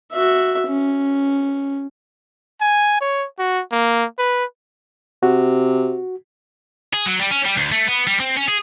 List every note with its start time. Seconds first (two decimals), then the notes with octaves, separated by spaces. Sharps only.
0.12 F#4 E5
0.68 C#4
2.61 G#5
3.01 C#5
3.39 F#4
3.72 A#3
4.19 B4
5.23 C3 F#4
6.94 G#4
7.06 F#3
7.20 G3
7.31 C#4
7.46 G3
7.57 D2
7.72 A3
7.87 B3
8.07 G3
8.20 C4
8.37 C#4
8.48 G#4